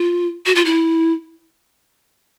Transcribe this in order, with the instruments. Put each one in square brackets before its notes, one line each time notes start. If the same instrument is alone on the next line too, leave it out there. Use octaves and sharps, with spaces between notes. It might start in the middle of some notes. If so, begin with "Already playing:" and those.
Already playing: [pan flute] F4
F#4
F4
E4